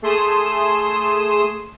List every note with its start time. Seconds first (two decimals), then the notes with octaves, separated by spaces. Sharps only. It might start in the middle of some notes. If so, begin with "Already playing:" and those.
0.02 A3 G#4 C6 D#6 E7